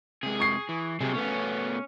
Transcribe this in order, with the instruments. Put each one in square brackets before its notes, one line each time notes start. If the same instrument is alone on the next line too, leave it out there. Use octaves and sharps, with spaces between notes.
[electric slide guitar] C3 G#3 [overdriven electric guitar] G#4
[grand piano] C#6 C7
[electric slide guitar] E3
[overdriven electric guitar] C3 [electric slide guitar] F#3 G3 G#4
[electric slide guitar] B2 A3 B3 [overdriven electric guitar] C#4